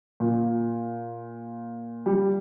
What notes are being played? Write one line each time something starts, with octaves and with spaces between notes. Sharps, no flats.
A#2
G3